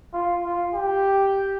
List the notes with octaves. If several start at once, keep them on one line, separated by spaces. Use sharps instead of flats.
F4
F4
G4